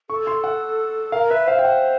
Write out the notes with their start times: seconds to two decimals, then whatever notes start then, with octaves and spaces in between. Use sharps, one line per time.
0.10 A4 C#6
0.27 C6
0.44 F#5
1.12 A#4 F5
1.30 B4 E5
1.47 C5 F5
1.59 G5
1.65 F#5